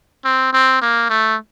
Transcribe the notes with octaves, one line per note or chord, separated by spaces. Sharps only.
C4
C4
A#3
A3